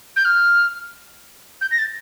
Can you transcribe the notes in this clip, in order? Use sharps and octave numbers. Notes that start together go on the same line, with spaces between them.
G6
F6
G6
A#6
A6